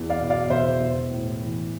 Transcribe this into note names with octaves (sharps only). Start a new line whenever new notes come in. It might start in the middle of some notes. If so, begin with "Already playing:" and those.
Already playing: E2
D5 F5
B2
D5 F5
E1 C5 E5
E1
A2
E3